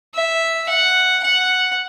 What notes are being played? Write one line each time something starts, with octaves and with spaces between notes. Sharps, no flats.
E5
F#5
F#5